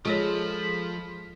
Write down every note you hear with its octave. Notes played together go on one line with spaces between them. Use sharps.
F3 G#3 F4 G#4 A4 C#5 B5